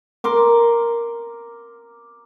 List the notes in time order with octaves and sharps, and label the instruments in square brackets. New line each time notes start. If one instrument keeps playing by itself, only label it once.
[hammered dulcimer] A#4 C6 D6